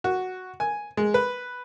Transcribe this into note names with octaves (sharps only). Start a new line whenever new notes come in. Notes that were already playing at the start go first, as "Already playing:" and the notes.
F#4
G#5
G#3
B4